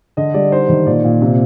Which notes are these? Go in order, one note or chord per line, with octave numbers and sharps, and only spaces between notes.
D3 D#5
G3 D5
D#4 C5
D#3
A#2 D5
A#2
C3